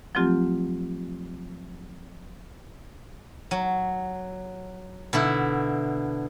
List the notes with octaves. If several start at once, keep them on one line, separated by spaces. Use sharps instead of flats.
F3 F#3 A3 C4 F4 G4
F#3
B2 D3 E4